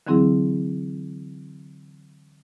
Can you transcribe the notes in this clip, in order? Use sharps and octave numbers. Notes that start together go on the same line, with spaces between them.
D3 E3 F#3 C4 E4 G#4